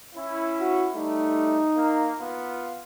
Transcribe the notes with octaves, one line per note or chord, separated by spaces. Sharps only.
C#4 E4
F#4
G3 A3 D#4
A#3
B3 F4